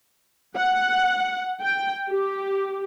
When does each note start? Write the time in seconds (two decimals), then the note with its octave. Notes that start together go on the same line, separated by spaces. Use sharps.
0.56 F#5
1.61 G5
2.09 G4